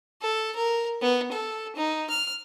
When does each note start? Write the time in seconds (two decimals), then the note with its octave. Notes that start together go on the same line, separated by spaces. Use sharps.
0.22 A4
0.56 A#4
1.01 B3
1.32 A4
1.76 D#4
2.10 F6